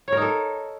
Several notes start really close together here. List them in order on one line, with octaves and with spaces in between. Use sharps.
C#5 A#4 D#4 A4